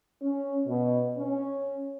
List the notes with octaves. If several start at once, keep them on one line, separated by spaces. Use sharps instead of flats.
C#4
B2
C#4